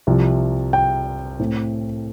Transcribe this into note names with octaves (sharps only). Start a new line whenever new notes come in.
C2 C3 F3
G5
A2 A3 C4